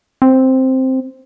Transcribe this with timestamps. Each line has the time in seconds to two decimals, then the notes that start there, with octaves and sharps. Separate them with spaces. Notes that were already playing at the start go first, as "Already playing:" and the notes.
0.22 C4